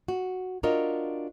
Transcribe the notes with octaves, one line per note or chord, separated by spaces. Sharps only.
F#4
D4 F4 F#4 A#4 C#5 D#5